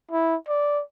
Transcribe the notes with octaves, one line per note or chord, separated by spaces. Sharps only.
E4
D5